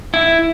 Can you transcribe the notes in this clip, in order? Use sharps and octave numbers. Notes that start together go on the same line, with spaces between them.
E4